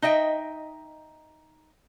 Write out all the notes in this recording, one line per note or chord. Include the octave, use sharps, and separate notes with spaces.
D#4 D#5 E5 G5